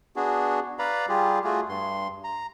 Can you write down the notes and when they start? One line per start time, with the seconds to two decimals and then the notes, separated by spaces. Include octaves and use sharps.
0.16 B3 D4 F#4 G#4
0.79 B4 D5 F5 A#5 B5
1.09 G3 F4 G4 G#4
1.44 A3 F4 F#4 G#4
1.69 G2 C6
2.24 A#5